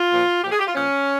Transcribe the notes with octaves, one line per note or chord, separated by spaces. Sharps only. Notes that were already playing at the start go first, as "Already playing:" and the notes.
Already playing: F4
A#2 F3
A#2 F3 G4
G#4
G4
F4
A#2 F3 C#4